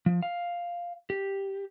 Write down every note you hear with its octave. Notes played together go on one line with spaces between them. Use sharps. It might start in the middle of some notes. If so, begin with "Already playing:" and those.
F3
F5
G4